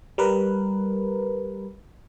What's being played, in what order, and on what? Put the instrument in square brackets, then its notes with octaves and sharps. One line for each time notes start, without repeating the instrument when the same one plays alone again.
[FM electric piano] G3 A#4 B4